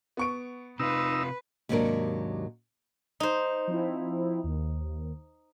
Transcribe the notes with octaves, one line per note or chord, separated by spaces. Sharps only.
B3 C#6 D7
C3 D#4 F4 B4 E6
D#2 G#2 C3 F#3 D4 A#4
D#4 C5
F3 C4 E4
D#2